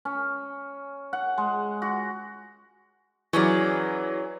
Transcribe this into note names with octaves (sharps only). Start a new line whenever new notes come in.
C#4
F#5
G#3
F#4
E3 F#3 C#4 G#4 D5